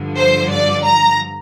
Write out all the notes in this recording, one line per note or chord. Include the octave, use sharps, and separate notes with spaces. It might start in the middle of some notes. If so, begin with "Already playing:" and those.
Already playing: G2 D3 F3
C5
D5
A#5